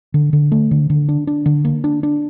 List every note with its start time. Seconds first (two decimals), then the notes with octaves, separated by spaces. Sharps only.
0.14 D3
0.33 D3
0.52 A3
0.71 D3
0.90 D3
1.09 D4
1.27 D4
1.46 D3
1.65 A#3
1.84 D4
2.03 D4